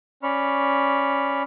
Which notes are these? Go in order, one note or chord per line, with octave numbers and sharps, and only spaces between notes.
C#4 D5 B5 C#6 F6